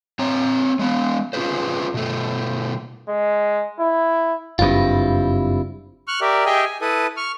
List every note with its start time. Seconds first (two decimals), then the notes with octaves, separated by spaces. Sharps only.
0.19 C4 C#5 A#5
0.79 G#3 B3
1.33 C#4 F4 G4 G#4 B4 C5
1.94 B2 A3
3.09 G#3
3.80 E4
4.59 F#1 G2 C4 E4 F4
6.08 C#6 F6 F#6
6.21 G4 A#4 D5 E5
6.46 G4 G#4 D#5 E5 G5 G#5
6.65 G#5
6.81 E4 A4 B4 D#6
7.17 C#6 F6